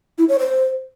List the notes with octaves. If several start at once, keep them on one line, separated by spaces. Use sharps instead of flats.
E4
C#5
C5